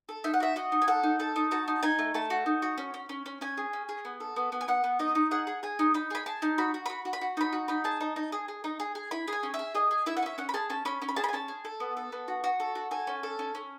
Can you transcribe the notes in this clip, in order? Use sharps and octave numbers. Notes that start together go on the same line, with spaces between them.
A4
D#4 E5
F#5
F#4 E5
F#4 D#5
D#4
G#5
A4 F#5
D#4
A4 A5
D#4
F#4 A5
D#4
D#4 G#5
A3
A3 A5
F#4
D#4
F#4
C#4
C#4
C#4
C#4
C#4 G#5
G#4
C#4
G#4
B3
A4
B3
B3
G#5
B3 F#5
B3
D#4 D#5
D#4
G#4 F#5
G#4
G#4 G#5
D#4
D#4 B5
G#4 B5
G#4 A5
D#4
F#4 B5
F#4
F#4 B5
F#4
B5
F#4
D#4 B5
F#4
D#4 B5
G#4 A5
D#4
D#4
G#4
G#4
D#4
G#4
G#4
E4 B5
G#4 G#5
C#4
E5
G#4
G#4 D#5
G#4
E4 E5
F#5
C#4 E5
C#4 F#5
B5
G#4 A5
C#4 A5
C#4 B5
C#4
B5
G#4 A5
B5
G#5
C#4 A5
G#4
A4
B3
A4
B3
F#4
F#4
A4
F#4
A4 G#5
C#4
A4
C#4
C#4